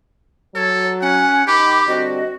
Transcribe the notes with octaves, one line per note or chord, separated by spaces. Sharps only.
F#3 A4 C#5
C#4 F#5 G#5
D#3 G4 B5 D6
D3 G3 C4 F#4 D#5